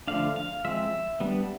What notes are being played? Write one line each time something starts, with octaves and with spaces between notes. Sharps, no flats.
D3 F3 A3 D4 F5
F5
F3 G#3 C4 E5
G3 B3 D4